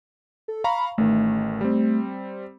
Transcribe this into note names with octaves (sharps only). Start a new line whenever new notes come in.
A4
F5 A#5 B5 C#6
A1 D#3 A3
G3 C4